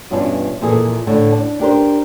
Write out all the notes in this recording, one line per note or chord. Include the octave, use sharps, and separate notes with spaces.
G2 B2 E3 C#4 D4 F4
F2 A#2 E3 G#4 A4
A2 D3
D4
D4 G4 A#4 C5